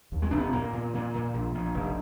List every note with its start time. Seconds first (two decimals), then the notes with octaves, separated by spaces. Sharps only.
0.12 D#2
0.22 G#3
0.31 F1 D4
0.38 B3
0.53 A#2 A#3
0.73 A#2
0.93 A#2
1.14 A#2
1.34 A#1
1.55 A#1
1.74 F1